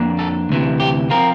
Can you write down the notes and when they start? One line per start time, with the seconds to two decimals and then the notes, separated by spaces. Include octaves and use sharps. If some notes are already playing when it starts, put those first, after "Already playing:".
Already playing: F2 A#3 D4
0.19 A4
0.49 D2 C3 E3
0.80 G4
1.10 F3 C4 F4 A#4